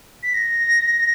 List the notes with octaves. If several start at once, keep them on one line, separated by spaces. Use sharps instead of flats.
B6
A#6